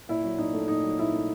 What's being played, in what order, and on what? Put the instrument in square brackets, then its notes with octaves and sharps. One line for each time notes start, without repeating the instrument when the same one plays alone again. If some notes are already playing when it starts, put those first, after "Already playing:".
[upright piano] A#2 E4
F#3
A#2 D#4
A3
A#2 D#4
F#3
A#2 E4
A3